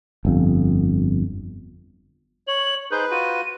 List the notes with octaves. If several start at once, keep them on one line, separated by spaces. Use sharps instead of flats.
G1 F2
C#5 F#7
D#4 G#4 B4 C5 G6
F4 F#4 D#7